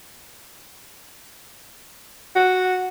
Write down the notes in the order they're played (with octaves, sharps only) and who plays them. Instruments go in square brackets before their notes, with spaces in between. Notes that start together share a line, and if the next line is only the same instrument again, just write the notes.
[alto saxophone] F#4